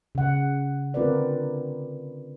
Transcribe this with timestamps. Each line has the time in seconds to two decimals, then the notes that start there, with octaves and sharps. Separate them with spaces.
0.15 C#3 F#5
0.94 D3 C4 F4 A#4 B4 D5